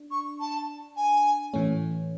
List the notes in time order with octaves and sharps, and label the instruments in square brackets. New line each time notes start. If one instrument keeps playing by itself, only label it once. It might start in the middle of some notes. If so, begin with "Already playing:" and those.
Already playing: [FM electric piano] D4
[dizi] C#6
A5
G#5
[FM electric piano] A2 E3 A3 C#4